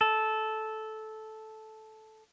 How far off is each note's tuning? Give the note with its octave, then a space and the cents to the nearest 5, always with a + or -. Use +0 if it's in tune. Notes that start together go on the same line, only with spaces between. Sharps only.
A4 -10